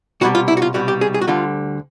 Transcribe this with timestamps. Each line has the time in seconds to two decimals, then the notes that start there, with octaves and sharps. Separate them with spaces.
0.21 C2 B2 G3 F#4
0.35 F4
0.48 E4
0.57 F#4
0.62 F4
0.74 C2 B2 G3 F#4
0.88 G4
1.01 G#4
1.14 G#4
1.21 F#4
1.27 D2 D3 G3 F4